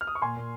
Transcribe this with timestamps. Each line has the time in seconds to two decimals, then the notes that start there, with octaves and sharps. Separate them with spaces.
0.01 F6
0.07 D#6
0.15 C#6
0.22 A#2 G#5 C6
0.36 A#2